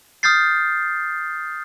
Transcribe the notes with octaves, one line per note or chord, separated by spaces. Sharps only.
D#6 F6 G6 A6 C7